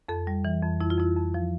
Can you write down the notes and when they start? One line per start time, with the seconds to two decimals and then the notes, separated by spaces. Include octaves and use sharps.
0.08 F2 A4
0.27 G3
0.45 E3
0.63 F2
0.80 F2 E4
0.90 F4
0.99 F2 E4
1.17 F2
1.34 F3